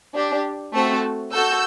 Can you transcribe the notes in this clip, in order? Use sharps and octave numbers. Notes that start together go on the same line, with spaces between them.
D4 G4
A3 C4 F#4 A4
F#4 A4 E6 G6